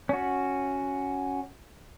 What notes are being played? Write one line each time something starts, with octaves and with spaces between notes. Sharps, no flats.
C#4 F#4